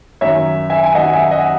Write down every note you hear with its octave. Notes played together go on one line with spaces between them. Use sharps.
F#2 D#3 C#5 E5
E5 G#5
G#5
F#2 D#3 D#5 F#5
E5 G#5
D#5 F#5